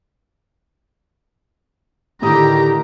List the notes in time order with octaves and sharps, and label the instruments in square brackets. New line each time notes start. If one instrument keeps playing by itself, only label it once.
[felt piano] A2 E4 D#6 [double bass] D3 D#3 [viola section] G4 [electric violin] A#5